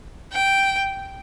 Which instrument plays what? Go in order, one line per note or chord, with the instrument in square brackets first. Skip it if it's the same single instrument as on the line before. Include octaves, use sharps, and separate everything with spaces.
[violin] G5